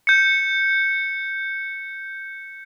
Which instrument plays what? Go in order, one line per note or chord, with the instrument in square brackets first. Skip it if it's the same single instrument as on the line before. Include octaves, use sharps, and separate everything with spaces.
[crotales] G6 C#7